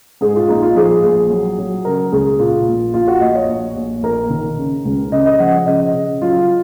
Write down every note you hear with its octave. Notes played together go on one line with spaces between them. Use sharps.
G#2 G#4
F4
A#1 D#4
F4
F3 G#4
A#1
F#3
F#3
C#3 A#4
C#2 G#4
A#2 F4
A#1
A#1 F4
F#4
A#1 D#5
C#5
A#1
A#1
A#1 A#4
D#3
C#3
C#2
C#3 D#5
D#5
F3 F#5
C#3 D#5
C#3
F#3 F4